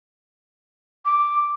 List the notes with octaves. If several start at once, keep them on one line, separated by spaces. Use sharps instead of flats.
D6